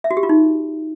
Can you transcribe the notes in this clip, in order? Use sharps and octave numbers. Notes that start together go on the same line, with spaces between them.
E5
F#4
G4
F4
D#4